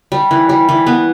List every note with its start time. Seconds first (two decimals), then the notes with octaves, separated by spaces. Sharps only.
0.12 G3
0.31 E3
0.49 G3
0.69 E3
0.87 B3